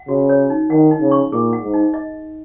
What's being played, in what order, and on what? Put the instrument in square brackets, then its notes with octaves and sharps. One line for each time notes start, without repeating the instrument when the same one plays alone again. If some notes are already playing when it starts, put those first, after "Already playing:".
Already playing: [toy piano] F#5
[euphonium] C#3 [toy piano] F#4
[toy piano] C#5
D#4
[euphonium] D#3 [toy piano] F#5
[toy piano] D#4
[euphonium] C#3
[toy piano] C#6
[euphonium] A#2 [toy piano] G#4
[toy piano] F#5
[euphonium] G#2
[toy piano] D#4
D#5